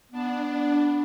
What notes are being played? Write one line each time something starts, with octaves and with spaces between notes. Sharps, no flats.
B3 D4